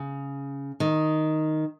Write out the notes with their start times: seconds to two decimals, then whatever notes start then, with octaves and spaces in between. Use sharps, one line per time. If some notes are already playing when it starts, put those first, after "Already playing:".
Already playing: C#3
0.80 D#3